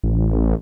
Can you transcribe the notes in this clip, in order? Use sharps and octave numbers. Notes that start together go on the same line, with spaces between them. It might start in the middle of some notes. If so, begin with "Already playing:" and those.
A1